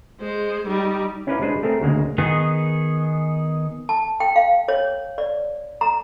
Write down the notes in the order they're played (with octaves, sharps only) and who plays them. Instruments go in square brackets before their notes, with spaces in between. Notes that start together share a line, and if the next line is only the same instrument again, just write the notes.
[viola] G#3 C5
G3 D#4
[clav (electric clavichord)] C#4 E4 A#4 B4 D5 F5
G#3 D4 G#4 B4 C5
A3 C4 G#4 A#4
D2 C#3 G#3 A#3
[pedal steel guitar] D#3 B3 G#4
[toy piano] A5
G5
F5
C#5
D5
A#5